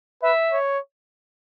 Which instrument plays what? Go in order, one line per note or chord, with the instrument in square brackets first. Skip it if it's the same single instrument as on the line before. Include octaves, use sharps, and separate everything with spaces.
[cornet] B4 [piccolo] E5
[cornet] C#5